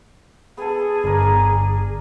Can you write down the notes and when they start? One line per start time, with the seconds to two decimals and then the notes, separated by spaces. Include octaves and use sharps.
0.57 B3 G#4 A4
1.04 G1 A#4 D5